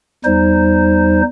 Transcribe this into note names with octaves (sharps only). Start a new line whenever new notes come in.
E2 G3 D#4 C5